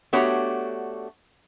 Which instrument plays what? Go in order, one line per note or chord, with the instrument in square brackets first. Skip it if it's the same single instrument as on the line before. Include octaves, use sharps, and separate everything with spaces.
[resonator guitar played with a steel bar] A3 B3 D4 F#4 G4 C#5